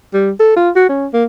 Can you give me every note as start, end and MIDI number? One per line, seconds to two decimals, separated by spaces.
0.14 0.31 55
0.40 0.53 69
0.56 0.70 65
0.76 0.86 66
0.89 1.07 61
1.13 1.25 58